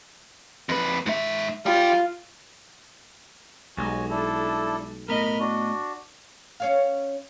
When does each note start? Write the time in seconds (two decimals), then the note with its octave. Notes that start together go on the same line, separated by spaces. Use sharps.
0.69 F2 B4
1.06 G#2 E5
1.66 G3 F4 G5
3.77 B1 G3 G#3 F#4 G#5
4.10 D4 E4 A4
5.08 A2 B3 A#4 D#5 B5 F6
5.40 D4 F#4
6.60 C#4 C#5 F5